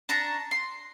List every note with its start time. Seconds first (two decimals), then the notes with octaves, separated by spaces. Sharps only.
0.09 D4 A5 A#5 C#6
0.51 C6